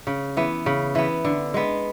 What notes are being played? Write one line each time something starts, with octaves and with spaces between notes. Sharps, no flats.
C#3
E3 B3
C#3
E3 B3
D3
G#3 B3